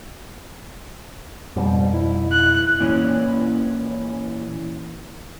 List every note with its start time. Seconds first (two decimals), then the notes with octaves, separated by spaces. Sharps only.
1.56 F2 G#2 B2 G3
1.93 E4
2.32 F#6
2.80 A#2 E3 C#4